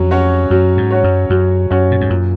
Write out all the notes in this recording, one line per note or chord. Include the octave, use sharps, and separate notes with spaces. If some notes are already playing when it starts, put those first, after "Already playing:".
Already playing: F2 F#3 C#4 C#5
C#4 F#4 C#5
F#2 F#3
G#2
C#4 F#4 C#5
F#2
F#2 F#3
F#2 C#4 F#4 C#5
A#2
G#2
F#2 A#2